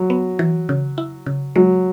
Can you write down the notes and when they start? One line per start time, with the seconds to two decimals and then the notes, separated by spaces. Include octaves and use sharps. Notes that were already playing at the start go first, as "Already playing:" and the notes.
Already playing: F#3
0.10 B3
0.39 E3
0.69 C#3
0.98 E4
1.26 C#3
1.56 F#3 G#3